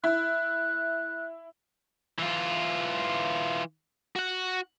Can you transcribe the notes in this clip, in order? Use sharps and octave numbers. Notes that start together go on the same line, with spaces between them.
E4 F#6
E3 F4
F#4 F#5